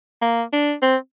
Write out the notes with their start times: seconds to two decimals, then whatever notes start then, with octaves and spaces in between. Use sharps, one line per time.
0.22 A#3
0.53 D4
0.82 C4